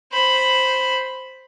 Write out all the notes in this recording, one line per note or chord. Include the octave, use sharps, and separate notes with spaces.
C5 B5